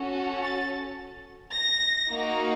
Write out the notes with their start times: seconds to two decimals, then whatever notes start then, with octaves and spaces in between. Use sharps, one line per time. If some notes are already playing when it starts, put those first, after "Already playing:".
Already playing: C#4 F#4 A4
0.43 A6
1.53 A#6
2.09 A#3 D#4 F#4